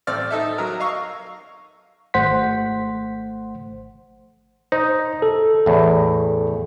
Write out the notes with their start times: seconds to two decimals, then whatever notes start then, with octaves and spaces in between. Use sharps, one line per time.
0.07 A1 C4 D5 E6 F6
0.31 D#4 A4 E5
0.58 F#3 A#4
0.80 D#5 F5 C#6 E6
2.14 G#1 A3 C5 F#5 C6 B6
4.72 D#4 C5
5.22 A4
5.66 E2 A2